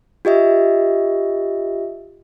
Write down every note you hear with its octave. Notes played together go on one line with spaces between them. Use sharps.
F4 G4 D#5 E5